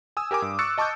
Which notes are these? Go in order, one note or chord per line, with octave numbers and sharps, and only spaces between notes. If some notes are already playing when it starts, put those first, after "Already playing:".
G#5 D#6 E6
G4 A#4 G#5 D6
G2
C#6 E6 F#6 A6 C#7
D#5 A5 C#6 D6 E6 G6